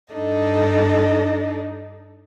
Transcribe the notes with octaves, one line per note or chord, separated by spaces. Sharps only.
G2 D4 D#4 A4 D5 D#5